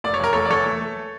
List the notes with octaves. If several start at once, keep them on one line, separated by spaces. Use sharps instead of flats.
F1 D5
C#5
E2 A#4
F1 A4 C#5
D5
E2 A4 C#5
A3
A3